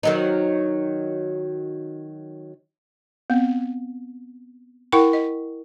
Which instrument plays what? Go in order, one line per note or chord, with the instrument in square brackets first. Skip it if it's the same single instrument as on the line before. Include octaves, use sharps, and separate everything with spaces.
[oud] D#3 F#3 D#4
[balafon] B3 C4
E4 A#4 F#5 G5 C#6
D#5